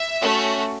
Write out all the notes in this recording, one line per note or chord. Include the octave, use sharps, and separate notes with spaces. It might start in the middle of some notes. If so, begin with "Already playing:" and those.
Already playing: E5
A3 C#4 F#4